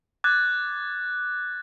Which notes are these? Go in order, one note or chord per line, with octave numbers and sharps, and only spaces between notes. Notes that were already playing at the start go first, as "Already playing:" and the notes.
D6 F#6 G#6 A6